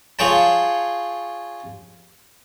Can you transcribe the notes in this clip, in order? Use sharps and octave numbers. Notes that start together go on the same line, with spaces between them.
F4 G#4 C#5 G5 A5